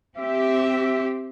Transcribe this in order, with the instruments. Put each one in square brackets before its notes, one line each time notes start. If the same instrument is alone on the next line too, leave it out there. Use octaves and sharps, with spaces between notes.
[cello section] C4 G4 [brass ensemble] E5